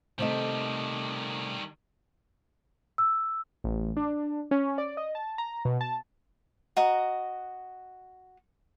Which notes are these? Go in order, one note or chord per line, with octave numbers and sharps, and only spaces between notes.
C3 D#3 G3 A3 D#5
E6
A1
D4
C#4
D5
D#5
A5
A#5
B2
A5
F#4 D#5 A#5